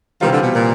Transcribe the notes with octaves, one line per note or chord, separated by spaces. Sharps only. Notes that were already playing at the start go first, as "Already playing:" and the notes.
C3 D#3 E3 G3 C4 F4
D3
B2
A#2